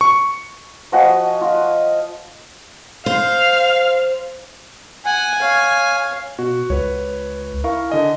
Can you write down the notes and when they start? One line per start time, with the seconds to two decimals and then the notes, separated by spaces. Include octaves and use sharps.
0.01 C#6
0.92 F3 F#4 D#5 G#5
1.41 F4 D#5
3.06 C5 F5
5.05 F#5 G#5
5.41 C#5 F5
6.38 B2 F#4
6.70 C#2 B4 C#5
7.64 E4 A#4 F5 C#6
7.90 D3 D#5 G#5